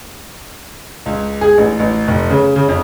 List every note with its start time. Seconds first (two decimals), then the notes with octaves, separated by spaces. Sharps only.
1.06 C#2
1.41 G#4
1.58 A1
1.80 A1
2.08 F1
2.30 C#3
2.56 C#3
2.69 F2